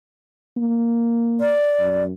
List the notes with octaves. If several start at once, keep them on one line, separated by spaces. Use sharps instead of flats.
A#3
D5
F#2